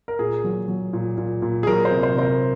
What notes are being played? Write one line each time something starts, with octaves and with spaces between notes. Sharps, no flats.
A#4
A#2 G#4
F#3
F#3
A#2
A#2
A#2
G#4
F#3 A#4
C5
C3
C5
C3 C5
A#4